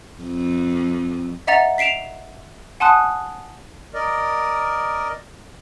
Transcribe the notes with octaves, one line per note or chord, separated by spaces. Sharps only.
F2
D#5 E5 F#5 A#5 A6
B6 C7 D7 E7 F7
F#5 G#5 A5 C6 D#6 F#6
A#4 D5 D#5